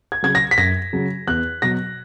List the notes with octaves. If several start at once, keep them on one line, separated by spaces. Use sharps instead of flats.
G#6
C#3 F#3 G#6
A#6
B6
F#2 A#6
C#3 F#3
E2 F#6
B2 F#3 A#6